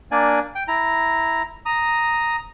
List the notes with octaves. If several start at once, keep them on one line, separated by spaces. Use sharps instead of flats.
A#3 D4 D5 G#5
G5
E4 A#5
A#5 D#6